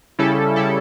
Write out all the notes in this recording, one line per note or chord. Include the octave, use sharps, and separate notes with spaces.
C#3 G3 C#4 E4 A4
C#3 G3 C#4 E4 A4